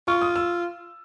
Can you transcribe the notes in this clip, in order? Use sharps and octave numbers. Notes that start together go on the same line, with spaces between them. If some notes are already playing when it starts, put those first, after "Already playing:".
F4 C#6
D#6
E6